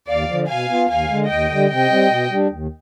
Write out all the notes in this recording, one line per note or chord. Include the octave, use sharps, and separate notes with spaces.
D#2 D5 F5
D3 F3
B2 F5 G#5
B3 F4
D#2 F5 G#5
D3 G#3
D#2 D#5 G5
D3 G3
C3 D#5 G5
G3 C4
B2
G3 D4
D#2